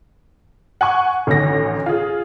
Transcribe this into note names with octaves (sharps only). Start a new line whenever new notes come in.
F#5 G#5 C#6
A1 D2 D#3 A#6
F4 G#4